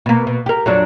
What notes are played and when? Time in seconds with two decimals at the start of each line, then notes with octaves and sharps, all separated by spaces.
0.06 B2 A#3
0.27 B2
0.46 G4 A#4
0.66 F2 F#3 D4